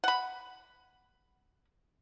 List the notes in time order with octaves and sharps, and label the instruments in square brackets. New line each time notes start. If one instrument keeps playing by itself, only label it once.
[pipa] F#5 B5